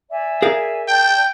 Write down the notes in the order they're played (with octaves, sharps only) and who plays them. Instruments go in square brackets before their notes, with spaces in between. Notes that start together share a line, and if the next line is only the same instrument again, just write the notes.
[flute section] D5 E5 G#5
[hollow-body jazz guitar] G#4 A#4 F5
[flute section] D5 A5 G6 [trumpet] G5